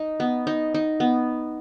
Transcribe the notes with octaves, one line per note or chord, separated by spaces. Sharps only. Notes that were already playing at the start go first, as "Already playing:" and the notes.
Already playing: D#4 D#5
B3
D#4
D#4
B3